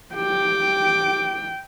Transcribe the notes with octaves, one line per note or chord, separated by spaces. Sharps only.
G4 G5 D6